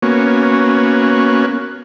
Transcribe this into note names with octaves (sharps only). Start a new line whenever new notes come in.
A#3 B3 C#4 F#4